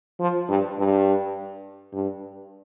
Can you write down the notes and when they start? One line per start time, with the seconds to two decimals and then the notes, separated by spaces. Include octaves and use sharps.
0.20 F3
0.49 G2
0.78 G2
1.93 G2